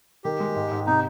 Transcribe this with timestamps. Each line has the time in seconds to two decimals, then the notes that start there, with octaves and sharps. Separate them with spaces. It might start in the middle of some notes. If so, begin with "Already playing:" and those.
0.24 D#3 G4
0.40 G#3
0.56 G#2
0.71 G#2
0.86 C3 D#4